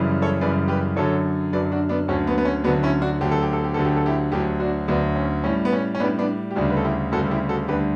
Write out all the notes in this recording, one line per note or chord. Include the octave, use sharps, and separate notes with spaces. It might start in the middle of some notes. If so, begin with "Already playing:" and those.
Already playing: F#2 C#3 E3 G3
A4 C#5
F#2 C#3 E3 G3 B4 D5
G4 B4
F#2 D3 F#3 A4 C#5
F#2 D3 F#3 B4 D5
D4 F#4
B3 D4
D2 D3 F#3 C#4
B3
B3
C#4
D2 D3 F#3 B3 D4
C#4 E4
D4 F#4
D2 D3 F#3 G4
A4
G4
A4
G4
D2 D3 F#3 A4
G4
A4
E4 G4
D2 D3 F#3 E4 G4
D4 F#4
D2 D3 F#3 B3 D4
C#4
A2 G3 C#4
B3
C#4
C#4
A2 G3 B3 D4
B3 D4
G4
D2 C#3 G3 D4 F#4
B4
A4
E4 G4
D2 C#3 G3 F#4 A4
A4
E4 G4
F#4 A4
D2 D3 G3 G4 B4